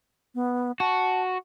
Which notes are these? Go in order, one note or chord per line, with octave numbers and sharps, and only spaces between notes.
B3
F#4 A5